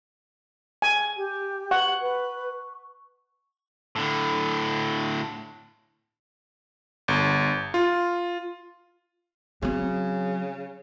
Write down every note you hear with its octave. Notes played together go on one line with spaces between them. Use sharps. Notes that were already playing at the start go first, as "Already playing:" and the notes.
G#5
G4
F#5 C#6
B4
A2 D3
G1
F4
C#3 F#3 C4